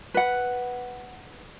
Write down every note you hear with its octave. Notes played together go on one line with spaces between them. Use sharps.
B4 F#5